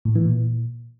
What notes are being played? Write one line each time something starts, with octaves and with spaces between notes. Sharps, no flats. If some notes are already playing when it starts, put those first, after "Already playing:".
A2
E3
A#2